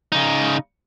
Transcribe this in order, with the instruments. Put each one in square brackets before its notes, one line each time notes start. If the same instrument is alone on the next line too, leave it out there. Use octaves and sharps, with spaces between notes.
[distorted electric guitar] C#3 D#4